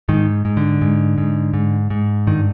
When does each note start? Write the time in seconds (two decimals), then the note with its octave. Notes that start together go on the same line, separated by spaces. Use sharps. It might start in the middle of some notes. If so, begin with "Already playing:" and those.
0.09 G#2 D#3
0.45 G#2
0.57 D3
0.81 G#2
1.18 G#2
1.54 G#2
1.90 G#2
2.27 G2 D#3